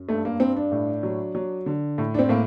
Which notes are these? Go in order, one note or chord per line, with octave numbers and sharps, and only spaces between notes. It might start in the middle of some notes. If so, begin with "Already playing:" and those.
Already playing: F#2
G2 A3
A#3
G2 C4
D4
A2
F#3
F#3
D3
A2
D4
C4
A2 A#3